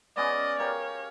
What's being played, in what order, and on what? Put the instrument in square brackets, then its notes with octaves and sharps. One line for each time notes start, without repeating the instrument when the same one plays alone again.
[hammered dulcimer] B3 C#4 G#4 [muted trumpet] D5 [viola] D#5
[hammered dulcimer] G4 A#4 F5 [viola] C#5